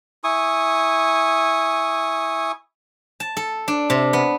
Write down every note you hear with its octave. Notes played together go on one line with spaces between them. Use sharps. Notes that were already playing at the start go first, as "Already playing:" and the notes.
E4 G#5 C#6 D#6
A5
A4
D4
C3
B3